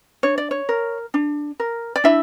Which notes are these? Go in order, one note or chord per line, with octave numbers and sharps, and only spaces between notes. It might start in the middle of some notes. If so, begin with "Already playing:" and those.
D4 C#5
D5
C#5
A#4
D4
A#4
D5
D4 E4 E5